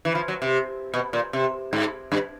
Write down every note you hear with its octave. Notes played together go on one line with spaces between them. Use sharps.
E3
F3
F#3
C3
B2
A#2
C3
G#2
G2